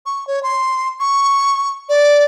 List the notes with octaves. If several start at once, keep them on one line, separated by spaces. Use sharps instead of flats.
C#6
C#5
C6
C#6
D5